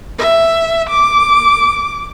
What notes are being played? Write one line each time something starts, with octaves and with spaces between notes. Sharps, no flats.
E5
D6